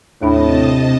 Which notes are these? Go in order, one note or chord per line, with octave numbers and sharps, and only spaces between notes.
D#2 A2 C3 D4 D#5 A5 B5